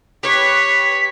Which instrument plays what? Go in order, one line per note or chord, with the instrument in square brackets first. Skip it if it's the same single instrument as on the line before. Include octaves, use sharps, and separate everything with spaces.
[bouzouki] G4 B4 [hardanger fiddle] C#5 [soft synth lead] B6